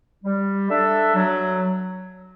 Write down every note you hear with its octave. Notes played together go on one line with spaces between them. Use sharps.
G3
D4 A4 E5
F#3